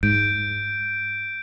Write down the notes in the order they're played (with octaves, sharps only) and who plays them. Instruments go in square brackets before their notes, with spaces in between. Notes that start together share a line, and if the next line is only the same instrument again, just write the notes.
[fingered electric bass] G#2 [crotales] G6 D7